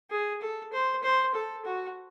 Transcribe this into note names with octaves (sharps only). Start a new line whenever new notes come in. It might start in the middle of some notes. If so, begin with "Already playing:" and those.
G#4
A4
C5
C5
A4
F#4